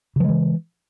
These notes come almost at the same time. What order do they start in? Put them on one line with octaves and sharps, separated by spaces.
C#3 F3 G#3 E3